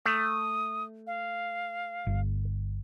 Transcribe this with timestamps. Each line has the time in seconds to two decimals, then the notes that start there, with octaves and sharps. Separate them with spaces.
0.06 A3 D#6
1.07 F5
2.07 G1